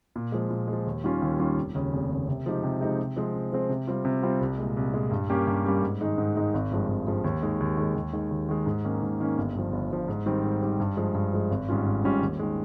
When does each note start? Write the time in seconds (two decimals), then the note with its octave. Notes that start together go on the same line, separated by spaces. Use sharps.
0.16 A#2
0.32 F3 G#3
0.50 A#2
0.68 G#3
0.73 F3
0.86 D#2
1.04 D#3 G3 C#4 F4
1.22 D#2
1.39 D#3 G3 C#4 F4
1.57 F1
1.75 D#2 C#3
1.93 F1
2.11 D#2 C#3
2.28 C3
2.46 F3 G#3 D#4 G4
2.63 C3
2.81 F3 G#3 D#4 G4
2.99 C3
3.16 F3 G#3 C4
3.34 C3
3.52 F3 G#3 C4
3.69 C3
3.87 G3 C4 F4
4.05 C3
4.23 G3 C4 F4
4.41 C2
4.58 A#2 G#3
4.77 C2
4.94 A#2 G#3
5.11 G2
5.29 G3 A#3 C#4 G4
5.47 G2
5.65 G3 A#3 C#4 G4
5.82 G#2
6.01 D#3 G#3 D#4
6.18 G#2
6.36 D#3 G#3 D#4
6.54 G#1
6.71 G2 F3 G#3
6.88 G#1
7.07 G2 F3 G#3
7.24 D#2
7.43 D#3 G#3
7.60 D#2
7.77 D#3 G#3
7.95 D#2
8.13 D#3 G#3
8.31 D#2
8.49 D#3 G#3
8.66 G#2
8.84 D#3 A#3 C#4
9.02 G#2
9.20 D#3 A#3 C#4
9.38 G1
9.55 G2 F3
9.73 G1
9.91 G2 F3
10.08 G#2
10.26 D#3 G3 C4
10.44 G#2
10.62 D#3 G3 C4
10.80 G2
10.97 F3 G#3
11.15 G2
11.33 F3 G#3
11.51 G#1
11.69 G#2 G3 C#4 F4
11.86 G#1
12.04 G#2 G3 C#4 F4
12.22 D#2
12.39 D#3 G#3